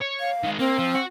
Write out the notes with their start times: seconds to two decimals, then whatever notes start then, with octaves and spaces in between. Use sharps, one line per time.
0.01 C#5
0.20 F5
0.43 D#3 G#3
0.59 A#3 C4
0.79 F3
0.95 F#4